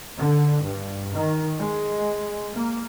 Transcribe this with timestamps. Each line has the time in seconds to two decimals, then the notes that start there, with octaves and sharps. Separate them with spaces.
0.18 D3
0.61 G2
1.13 D#3
1.59 G#3
2.53 A#3